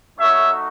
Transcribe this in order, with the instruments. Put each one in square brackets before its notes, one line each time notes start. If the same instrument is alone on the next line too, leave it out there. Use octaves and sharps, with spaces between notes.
[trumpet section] A3 D#4 F#4 C#5 E5